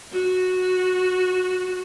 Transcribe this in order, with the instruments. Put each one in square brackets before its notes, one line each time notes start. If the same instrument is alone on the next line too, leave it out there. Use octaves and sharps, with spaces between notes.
[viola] F#4